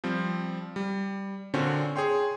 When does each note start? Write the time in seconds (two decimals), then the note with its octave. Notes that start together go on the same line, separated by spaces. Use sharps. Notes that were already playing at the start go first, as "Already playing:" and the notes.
0.04 F3 G3 C4
0.76 G3
1.54 A#2 D3 C4 C#4 F#4
1.96 G#4 C#5 G5 C6